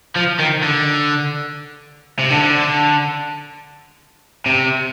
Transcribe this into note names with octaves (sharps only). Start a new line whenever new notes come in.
F3
D#3
D3
C3
D3
C3